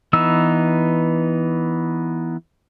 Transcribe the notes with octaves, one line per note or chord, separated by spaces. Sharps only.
E3 B3 D#4 E6